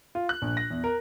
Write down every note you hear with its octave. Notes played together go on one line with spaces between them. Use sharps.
F4
F#6
A#1
A#6
E2
A#4